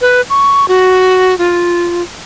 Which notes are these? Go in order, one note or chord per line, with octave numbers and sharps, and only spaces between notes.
B4
C#6
F#4
F4